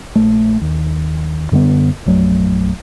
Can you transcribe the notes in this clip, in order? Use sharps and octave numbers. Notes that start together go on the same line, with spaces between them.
A#1 A3
D#2
F#2 D3 G3 B3
A#1 F#2 F#3 A3